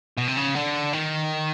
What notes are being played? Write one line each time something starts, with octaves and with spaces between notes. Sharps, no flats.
B2
C3
C#3
D3
D#3